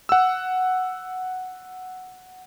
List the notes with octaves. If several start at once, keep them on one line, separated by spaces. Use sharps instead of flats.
F#5 E6